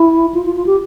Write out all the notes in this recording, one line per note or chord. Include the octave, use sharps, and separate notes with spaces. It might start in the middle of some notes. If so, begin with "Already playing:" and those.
Already playing: E4
F4
F4
F4
G4